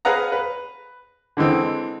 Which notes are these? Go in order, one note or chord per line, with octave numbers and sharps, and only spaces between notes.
G#4 B4 F5 F#5 A#5
B4
D3 E3 G#3 C4